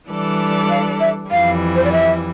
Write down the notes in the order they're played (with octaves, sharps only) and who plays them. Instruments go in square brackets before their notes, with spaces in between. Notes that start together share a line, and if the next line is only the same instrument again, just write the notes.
[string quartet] E3 G3 D4 A4 D5
[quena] F5
E5
[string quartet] F2 E3 G3 [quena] F5
[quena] C5
D5
E5